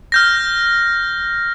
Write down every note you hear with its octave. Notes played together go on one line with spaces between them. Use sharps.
F6 G6 A#6